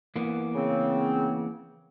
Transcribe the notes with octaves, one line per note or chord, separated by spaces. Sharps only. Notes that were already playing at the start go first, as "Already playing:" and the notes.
E3 A#3 B3
C#3 C4